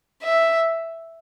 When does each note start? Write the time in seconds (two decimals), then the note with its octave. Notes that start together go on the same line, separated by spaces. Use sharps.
0.23 E5